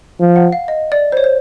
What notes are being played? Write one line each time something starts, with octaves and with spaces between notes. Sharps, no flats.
F3
F#5
F5
D#5
D5
C5
C#5
C5